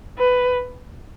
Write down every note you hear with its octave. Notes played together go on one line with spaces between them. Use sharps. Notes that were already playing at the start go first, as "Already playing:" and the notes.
B4